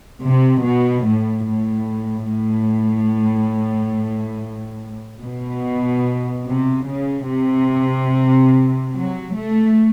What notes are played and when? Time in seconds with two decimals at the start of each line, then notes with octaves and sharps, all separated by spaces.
0.22 C3
0.63 B2
1.05 A2
1.47 A2
2.30 A2
5.20 B2
6.45 C3
6.86 C#3
7.28 C3
8.94 F#3
9.35 A3